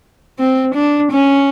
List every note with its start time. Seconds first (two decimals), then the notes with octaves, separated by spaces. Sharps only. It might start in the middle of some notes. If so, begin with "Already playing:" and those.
0.39 C4
0.74 D4
1.12 C#4